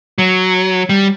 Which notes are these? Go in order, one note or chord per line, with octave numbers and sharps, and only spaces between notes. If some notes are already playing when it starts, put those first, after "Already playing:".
F#3
G3